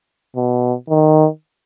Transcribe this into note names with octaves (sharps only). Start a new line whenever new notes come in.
B2
D#3